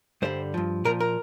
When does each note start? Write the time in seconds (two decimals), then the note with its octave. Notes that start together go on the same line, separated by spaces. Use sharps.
0.22 G2 D3 G3 C5
0.54 G2 F3
0.85 A#2 F3 A#4
1.00 A#4